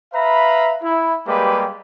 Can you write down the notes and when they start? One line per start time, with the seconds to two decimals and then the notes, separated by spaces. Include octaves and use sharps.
0.14 B4 E5 F5 A#5 B5
0.83 E4
1.27 G3 G#3 A#3 G4 B4